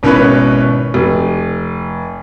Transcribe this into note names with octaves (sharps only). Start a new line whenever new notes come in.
G#1 B2 C#4 E4 B4 E5
F1